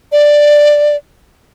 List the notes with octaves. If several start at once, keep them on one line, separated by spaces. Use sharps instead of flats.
D5